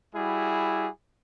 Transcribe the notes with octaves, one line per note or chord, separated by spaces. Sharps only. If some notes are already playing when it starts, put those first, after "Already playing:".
G3 E4 F#4 G#4